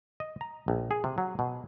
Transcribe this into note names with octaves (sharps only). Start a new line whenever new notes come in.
D#5
A#5
A#1
G#4
C3
F#3
B2